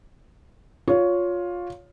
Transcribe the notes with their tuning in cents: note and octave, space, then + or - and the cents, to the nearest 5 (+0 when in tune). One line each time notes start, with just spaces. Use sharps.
F4 +15 C#5 +15